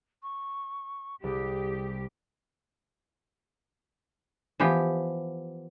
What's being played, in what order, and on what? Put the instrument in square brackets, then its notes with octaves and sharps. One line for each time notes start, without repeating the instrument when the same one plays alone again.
[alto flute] C#6
[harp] C2 [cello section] G4 [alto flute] G#4
[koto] E3 F3 B3 G4